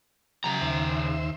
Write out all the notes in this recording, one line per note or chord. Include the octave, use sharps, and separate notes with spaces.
C#3 F#3 A#5
D#2 C5 E5